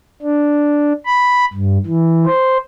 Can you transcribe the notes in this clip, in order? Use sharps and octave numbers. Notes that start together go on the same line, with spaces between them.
D4
B5
G2
E3
C5